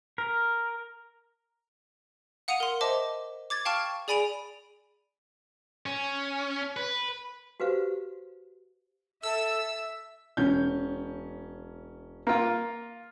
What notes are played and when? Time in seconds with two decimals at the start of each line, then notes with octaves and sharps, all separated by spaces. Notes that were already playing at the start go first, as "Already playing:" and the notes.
0.18 A#4
2.48 F5 F#5 D#6 C#7 D#7 F7
2.60 A#4 C6
2.81 C5 D#5 E5 A5 D6
3.50 D6 G#6 A6
3.65 F5 G5 A5 C#6 F6
4.08 G#4 D5 G#5 B5 D7 F7
5.86 C#4
6.77 B4
7.60 F#4 G4 B4 C5 F5
9.23 A4 E5 E6
10.37 E1 C#4 G6
12.27 A#3 F4